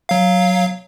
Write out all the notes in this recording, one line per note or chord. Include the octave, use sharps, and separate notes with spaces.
F#3 F5